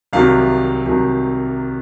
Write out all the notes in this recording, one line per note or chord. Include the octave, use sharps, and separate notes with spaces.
C2 C3 D#3 F#3 F5
C2 C3 D#3 F#3